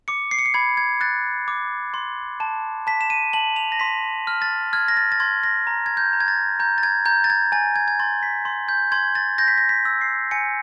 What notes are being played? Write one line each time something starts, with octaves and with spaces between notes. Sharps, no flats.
D6 C#7
C7
C#7
C7
B5 G#6
G#6
F#6 A6
D6
C6
A5
A5 B6
E7
D#7
A5 F#7
F7
A#6
C6 B6
F6
A6
F6 G#6
A#6
A6
A6
C6 G#6
A#6
A#5
G#6
G6
A#5
G#6
A6
A#5 G6
A6
G#6
A#5 G6
A6
G#6
G#5 A6
G#6
G#6
C6 A6
B6
C6
G6
C6 G#6
A6
G6 A#6
B6
A#6
B6
E6
C7
G#5 C#7